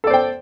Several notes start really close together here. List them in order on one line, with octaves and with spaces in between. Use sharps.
A4 D5 C5 G5